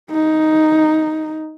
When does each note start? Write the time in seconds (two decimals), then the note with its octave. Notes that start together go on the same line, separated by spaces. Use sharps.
0.11 D#4